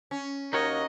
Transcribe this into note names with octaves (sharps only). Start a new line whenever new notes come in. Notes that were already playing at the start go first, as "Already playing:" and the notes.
C#4
D#2 D#4 F#4 A#4 C#5 D#5